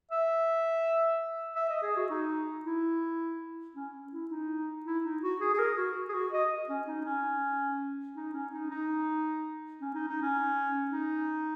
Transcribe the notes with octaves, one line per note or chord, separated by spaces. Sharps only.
E5
E5
D#5
G#4
F#4
D#4
E4
C#4
E4
D#4
E4
D#4
F#4
G#4
G#4
A#4
F#4
G#4
F#4
D#5
C#4
D#4
C#4
D#4
C#4
D#4
D#4
C#4
D#4
D#4
C#4
D#4